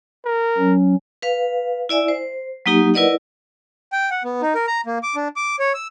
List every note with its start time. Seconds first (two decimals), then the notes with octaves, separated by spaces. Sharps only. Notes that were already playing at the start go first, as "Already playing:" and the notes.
0.25 A#4
0.58 F#3 C#4
1.22 B4 F5
1.89 E4 D5 E5 G#5
2.08 C5
2.66 F#3 A#3 D#4 G4
2.94 E4 A#4 B4 D5 D#5 F#5
3.92 G5
4.11 F#5
4.24 B3
4.42 D#4
4.55 A#4
4.68 A#5
4.86 A#3
5.03 D6
5.16 D4
5.36 D6
5.59 C#5
5.74 E6